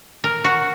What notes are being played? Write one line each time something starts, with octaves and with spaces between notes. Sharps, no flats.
A#4
F#4